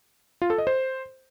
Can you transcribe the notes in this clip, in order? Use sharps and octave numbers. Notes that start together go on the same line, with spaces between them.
F4
A4
D#5
C5